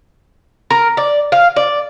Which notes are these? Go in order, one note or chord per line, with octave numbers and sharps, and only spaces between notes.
A#4
D5
F5
D5